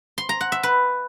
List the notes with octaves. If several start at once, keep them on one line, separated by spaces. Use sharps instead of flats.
C6
A#5
F#5
E5
B4